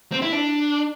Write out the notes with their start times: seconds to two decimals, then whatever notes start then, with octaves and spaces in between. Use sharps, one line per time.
0.12 C4
0.22 E4
0.32 D4